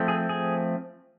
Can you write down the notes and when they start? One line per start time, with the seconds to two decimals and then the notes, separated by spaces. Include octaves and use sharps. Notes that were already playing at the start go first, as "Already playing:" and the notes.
Already playing: F3 A3 C4
0.08 G#4
0.29 G#4